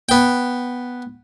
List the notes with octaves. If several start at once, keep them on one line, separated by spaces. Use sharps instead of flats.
B3 G5